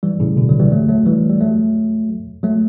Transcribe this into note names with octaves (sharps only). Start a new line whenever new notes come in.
E3 G3
A2 C#3
B2 D3
D3 F#3
E3 G3
F#3 A3
F#3 A3
E3 G3
G3
F#3 A3
F#3 A3